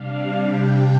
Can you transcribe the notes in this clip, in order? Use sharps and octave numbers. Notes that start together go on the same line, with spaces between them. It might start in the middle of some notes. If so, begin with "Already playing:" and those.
Already playing: C3 G3 D4 F5
G5